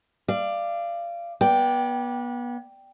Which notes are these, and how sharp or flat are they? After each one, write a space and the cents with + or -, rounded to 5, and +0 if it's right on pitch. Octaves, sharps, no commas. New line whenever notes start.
D5 +15 F5 -25
B3 -30 D5 +0 G5 +0